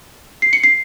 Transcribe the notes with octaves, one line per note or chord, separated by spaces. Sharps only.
C7
C#7
C7